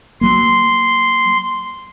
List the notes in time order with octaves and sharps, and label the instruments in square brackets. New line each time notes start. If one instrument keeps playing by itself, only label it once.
[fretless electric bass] F#3 A#3 [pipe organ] C6